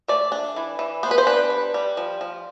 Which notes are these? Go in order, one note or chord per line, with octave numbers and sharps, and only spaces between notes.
A3 D5
D4
E3
E3
B3 C5
B4
C5
D4 B4
G3
G3
F3
F3